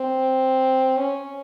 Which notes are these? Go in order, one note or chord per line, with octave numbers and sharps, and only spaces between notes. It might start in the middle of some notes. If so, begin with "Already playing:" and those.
Already playing: C4
C#4